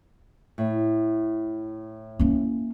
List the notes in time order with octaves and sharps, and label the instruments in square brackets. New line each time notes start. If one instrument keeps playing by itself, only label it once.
[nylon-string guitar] A2
[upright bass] A#3 C#4